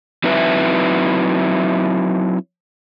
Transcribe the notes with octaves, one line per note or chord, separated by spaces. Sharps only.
F#3 C4 D#4 E4 B4 E5